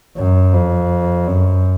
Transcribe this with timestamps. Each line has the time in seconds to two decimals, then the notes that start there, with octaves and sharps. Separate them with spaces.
0.17 F#2
0.53 F2
1.27 F#2